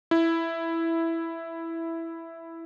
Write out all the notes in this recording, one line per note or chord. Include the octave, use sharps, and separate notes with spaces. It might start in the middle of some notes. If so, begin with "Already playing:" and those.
E4